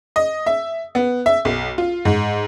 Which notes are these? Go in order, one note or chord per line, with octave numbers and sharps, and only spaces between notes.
D#5
E5
B3
E5
B1
F4
G#2